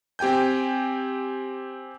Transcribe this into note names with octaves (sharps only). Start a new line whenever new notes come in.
C4 G4 G5 G#5 G6